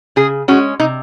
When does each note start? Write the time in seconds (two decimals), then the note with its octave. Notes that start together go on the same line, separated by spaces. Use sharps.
0.16 C#3 G#4
0.48 G#3 C#4 F#4
0.80 C3 D#4